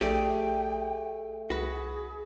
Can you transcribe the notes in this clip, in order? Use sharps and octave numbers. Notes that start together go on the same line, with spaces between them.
A#1 A3 G4 G#4 D5 G5
C2 F#4 G#4 B4